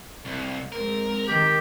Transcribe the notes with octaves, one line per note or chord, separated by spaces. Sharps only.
C2
G#2 C4 A#4
D#3 G4